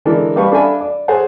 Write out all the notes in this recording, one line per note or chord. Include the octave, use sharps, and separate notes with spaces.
D3 E3 G#3 A4 A#4 D5
G3 B4 F5 A5 B5 C#6
D4 A4 E5 F5 G#5 B5
D5
G#4 A4 C5 C#5 F#5 G#5